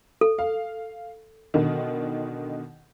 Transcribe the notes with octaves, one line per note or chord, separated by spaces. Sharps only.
A4
F5
B2 D3 D#3